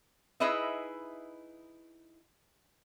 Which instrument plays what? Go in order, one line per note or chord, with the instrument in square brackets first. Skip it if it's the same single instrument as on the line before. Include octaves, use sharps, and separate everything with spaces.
[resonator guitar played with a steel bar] D#4 E4 G#4 B4 D#5 E5